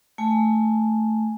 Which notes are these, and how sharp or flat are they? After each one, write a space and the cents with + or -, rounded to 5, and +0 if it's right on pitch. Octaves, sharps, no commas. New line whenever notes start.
A3 +0 G#5 +0